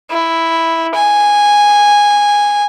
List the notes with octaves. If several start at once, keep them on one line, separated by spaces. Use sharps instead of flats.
E4
G#5